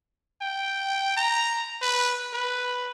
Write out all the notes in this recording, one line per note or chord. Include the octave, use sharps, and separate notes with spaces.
G5
A#5
B4
B4